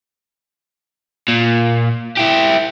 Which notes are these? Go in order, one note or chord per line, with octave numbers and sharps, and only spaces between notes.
A#2
E4 G4